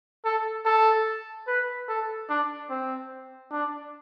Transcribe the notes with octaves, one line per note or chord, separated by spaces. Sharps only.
A4
A4
B4
A4
D4
C4
D4